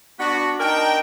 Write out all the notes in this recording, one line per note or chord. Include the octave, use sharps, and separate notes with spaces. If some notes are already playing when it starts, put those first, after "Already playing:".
B3 D4 F#4
D4 D#4 A#4 G5